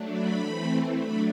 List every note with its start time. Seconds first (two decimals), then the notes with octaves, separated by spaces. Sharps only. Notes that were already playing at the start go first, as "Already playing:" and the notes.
Already playing: F#3 A3 D4
0.12 B5
0.41 E3 A3 C4
0.97 F#3 A3 D4 B5